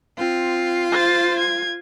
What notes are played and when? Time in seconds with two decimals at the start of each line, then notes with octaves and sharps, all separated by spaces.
0.18 C4 F4
0.92 C5 A6
1.39 G#6